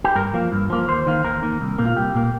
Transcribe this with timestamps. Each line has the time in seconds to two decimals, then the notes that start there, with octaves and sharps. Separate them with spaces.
0.04 G4
0.15 G2 A#4
0.34 F3 A#3
0.52 G2
0.70 F3 A#3
0.88 D#2 C5
1.07 D#3 A#3
1.24 D#2 A#4
1.43 D#3 A#3
1.61 C2
1.78 A#2 A#3
1.85 F4
1.96 C2 G4
2.15 A#2 A#3